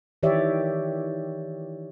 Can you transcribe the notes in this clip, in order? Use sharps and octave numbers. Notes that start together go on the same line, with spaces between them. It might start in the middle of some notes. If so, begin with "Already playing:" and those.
D#3 E3 G4 C#5 D5 E5